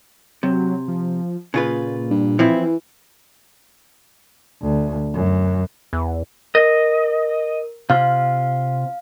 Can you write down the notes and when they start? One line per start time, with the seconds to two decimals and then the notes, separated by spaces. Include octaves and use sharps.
0.43 C3 F#3
0.88 F3
1.54 A#2 C#3 F4 B4
2.10 G2
2.39 E3 F3 C4 E4
4.62 D2
5.14 F#2
5.93 E2
6.55 A#4 D#5
7.90 C3 F4 F5